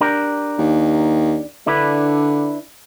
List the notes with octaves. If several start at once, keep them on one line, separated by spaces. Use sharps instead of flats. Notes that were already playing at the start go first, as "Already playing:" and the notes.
D4 G4 A#4
D#2
D3 D4 E4 B4